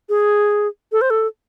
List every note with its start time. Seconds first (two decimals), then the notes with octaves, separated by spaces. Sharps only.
0.09 G#4
0.92 A4
1.01 C5
1.10 A4